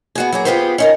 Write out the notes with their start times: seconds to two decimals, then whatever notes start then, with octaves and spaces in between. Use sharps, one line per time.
0.15 B3 F#4 G#4
0.32 F#3 A#3 G#4
0.45 B3 F4 G4 G#4 B4 C5
0.78 C#4 D#4 A#4